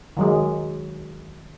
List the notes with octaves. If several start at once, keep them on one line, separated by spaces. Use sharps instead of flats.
D#3 F#3 G#3